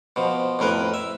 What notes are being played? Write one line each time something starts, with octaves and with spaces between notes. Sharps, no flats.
B2 F3
F2 A2 A#4 B4
E5